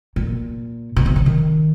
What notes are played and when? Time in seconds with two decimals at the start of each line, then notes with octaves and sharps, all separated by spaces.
0.16 A#2
0.96 B2
1.06 C3
1.16 C#3
1.26 D#3